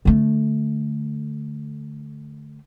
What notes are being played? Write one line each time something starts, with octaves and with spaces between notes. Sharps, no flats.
D3 A3